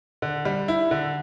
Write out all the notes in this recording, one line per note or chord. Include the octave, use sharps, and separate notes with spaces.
D3
G3
E4
D3